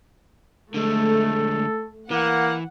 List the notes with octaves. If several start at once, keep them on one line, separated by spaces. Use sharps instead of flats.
D3 G#3 A3 A4
E3 A#3 F#5